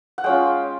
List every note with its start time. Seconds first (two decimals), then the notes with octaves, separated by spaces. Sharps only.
0.18 F#5
0.24 G#3 C#4 F4 G5